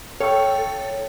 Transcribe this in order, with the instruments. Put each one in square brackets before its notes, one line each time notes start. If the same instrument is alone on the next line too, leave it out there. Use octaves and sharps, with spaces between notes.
[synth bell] A4 [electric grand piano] C#5 [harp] F5 G5 C#6